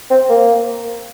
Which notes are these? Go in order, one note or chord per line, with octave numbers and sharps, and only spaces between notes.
C4
A#3